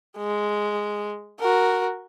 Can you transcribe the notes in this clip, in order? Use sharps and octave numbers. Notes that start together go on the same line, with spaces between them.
G#3
F#4 A#4